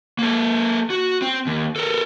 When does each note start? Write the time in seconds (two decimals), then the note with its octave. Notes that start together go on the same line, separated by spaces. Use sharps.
0.19 A#3 A4
0.90 F#4
1.22 C4
1.47 D#2
1.76 A4 A#4